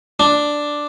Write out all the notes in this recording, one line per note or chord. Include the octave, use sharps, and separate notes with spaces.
D4